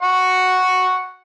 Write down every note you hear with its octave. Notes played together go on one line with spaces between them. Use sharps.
F#5 C#6